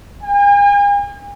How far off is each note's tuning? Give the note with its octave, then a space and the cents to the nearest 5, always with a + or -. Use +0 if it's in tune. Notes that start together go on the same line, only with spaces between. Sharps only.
G#5 -40